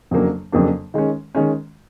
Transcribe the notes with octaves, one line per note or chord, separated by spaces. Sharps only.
F2 C#3 F#3 A#3 D4
F2 C#3 F#3 A#3 D4
D#3 G#3 C#4
D#3 G#3 C#4